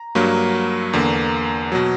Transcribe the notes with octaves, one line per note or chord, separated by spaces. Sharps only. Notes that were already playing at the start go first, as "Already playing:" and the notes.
Already playing: A#5
G2 F#3 A#3
E2 D3 A#3
B2 F#3